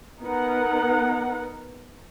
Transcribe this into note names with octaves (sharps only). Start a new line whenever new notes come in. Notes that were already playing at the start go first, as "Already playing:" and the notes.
B3 D#4 A#4 F#5